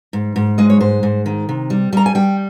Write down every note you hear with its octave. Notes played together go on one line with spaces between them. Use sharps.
G#2
G#2
G#3 D#5
C#5
G#2 C5
G#2
D#3
C3
G3
G3 A#5
G#5
G3 G5